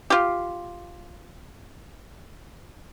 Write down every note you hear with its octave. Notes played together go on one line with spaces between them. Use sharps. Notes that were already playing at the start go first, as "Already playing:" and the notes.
F4 G4